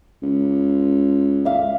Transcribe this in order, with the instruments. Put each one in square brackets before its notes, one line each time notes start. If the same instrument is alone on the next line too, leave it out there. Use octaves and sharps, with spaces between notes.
[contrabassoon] C#2
[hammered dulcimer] E5 F5